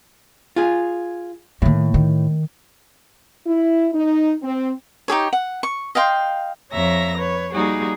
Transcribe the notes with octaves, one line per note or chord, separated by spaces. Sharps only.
F4 G#4
A2 D#3 A#3
D#3
E4
D#4
C4
D#4 G4 G#4 C#5
F#5
C#6
D#5 F5 G5 C6
F2 C#5 E5 A#5 A#6
B4 C#5
G3 A#3 D#4 F#4 G#4